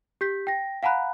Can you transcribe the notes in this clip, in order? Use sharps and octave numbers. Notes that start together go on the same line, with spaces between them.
G4 G6 B6
G5 A#6
F5 F#5 G#5 A#5 B5 F#6